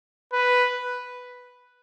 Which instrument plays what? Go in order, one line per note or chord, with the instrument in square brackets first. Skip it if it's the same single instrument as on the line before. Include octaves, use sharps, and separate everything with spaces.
[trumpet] B4